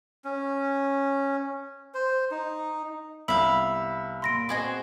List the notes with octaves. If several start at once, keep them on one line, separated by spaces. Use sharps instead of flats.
C#4
C5
D#4
C2 B3 E5 F5 B5
A#2 B5 C6 A#6 D7
B3 C4 F#4 G#4 C5 D#5